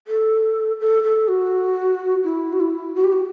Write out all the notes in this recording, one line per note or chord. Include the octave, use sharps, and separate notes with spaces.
A4
A4
A4
F#4
E4
F#4
E4
F#4
G4
F#4